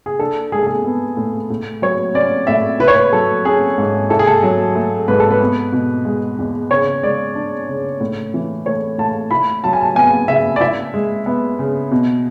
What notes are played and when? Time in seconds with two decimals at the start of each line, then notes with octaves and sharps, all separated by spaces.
0.06 G#4
0.19 D4 A4
0.52 G#3 G#4
0.59 A4
0.67 G#4
0.84 B3
1.17 A2
1.50 A2
1.82 F#3 C#5
2.14 C#4 D5
2.47 A2 E5
2.79 E4 B4
2.88 C#5
2.94 B4
3.13 F#3 A4
3.45 C#4 G#4
3.78 G#2
4.10 E4 A4
4.19 G#4
4.27 A4
4.43 F#3
4.75 A3
5.08 G#2 B4
5.20 A4
5.31 B4
5.41 B3
5.73 B2
6.05 G#3
6.39 E2
6.71 C#3 C#5
7.03 G#3 D5
7.35 D4
7.69 C#3
8.01 A2
8.34 E3
8.66 A3 C#5
8.98 A2 A5
9.31 E4 B5
9.64 F#3 A5
9.73 G#5
9.81 A5
9.96 B3 G#5
10.28 C#3 E5
10.56 D5
10.61 E4 E5
10.94 G#3
11.26 B3
11.59 C#3
11.91 B2